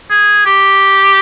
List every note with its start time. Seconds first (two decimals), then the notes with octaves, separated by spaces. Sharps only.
0.10 G#4
0.46 G4